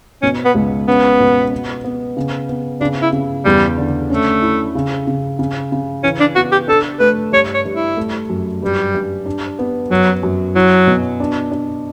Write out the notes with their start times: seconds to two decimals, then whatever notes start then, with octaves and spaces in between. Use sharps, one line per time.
0.22 B2 C#4
0.45 B3
0.55 C#2
0.88 B3 C#4
1.20 B2
1.51 B3
1.85 B3
2.17 C#3
2.49 B3
2.81 C#3 D4
3.02 E4
3.13 C#3
3.45 E2 G3
3.78 D3
4.10 A3 C#4
4.42 E4
4.75 C#3
5.07 C#3
5.39 C#3
5.72 C#3
6.03 E3 C#4
6.20 D4
6.35 B3 F#4
6.52 G4
6.68 D4 A4
7.00 A3 B4
7.32 G2 C#5
7.54 C#5
7.65 G2
7.75 E4
7.97 A3
8.29 F#2
8.62 G2 G3
8.94 G2
9.26 D4
9.59 B3
9.90 F#2 F#3
10.23 F#2
10.55 F#3 E4
10.87 B2
11.20 D4
11.52 D4